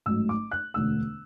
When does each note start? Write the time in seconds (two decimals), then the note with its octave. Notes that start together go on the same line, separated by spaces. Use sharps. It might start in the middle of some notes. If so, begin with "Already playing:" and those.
0.06 A1 G#2 F#3 A3 E6
0.29 D6
0.51 F#6
0.74 E1 D2 D3 A3 E6